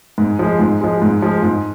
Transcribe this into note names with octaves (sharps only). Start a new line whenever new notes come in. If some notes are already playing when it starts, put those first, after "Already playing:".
G#2
F3 G#3
G#2
F3 G#3
G#2
F3 G#3
G#2